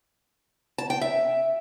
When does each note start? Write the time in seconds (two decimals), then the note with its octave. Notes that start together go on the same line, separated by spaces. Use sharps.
0.78 A5
0.90 G5
1.01 E5